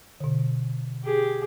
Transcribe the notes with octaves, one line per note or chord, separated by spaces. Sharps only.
B2 D3
G4 G#4